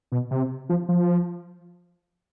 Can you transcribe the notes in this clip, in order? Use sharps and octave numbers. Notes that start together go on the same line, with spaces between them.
B2
C3
F3
F3